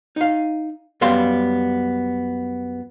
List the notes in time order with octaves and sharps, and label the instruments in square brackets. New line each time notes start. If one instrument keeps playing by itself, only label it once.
[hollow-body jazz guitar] D#4 F5
F#2 G3 B3 F5 C6